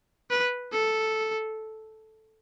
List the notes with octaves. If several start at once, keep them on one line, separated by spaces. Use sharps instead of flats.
B4
A4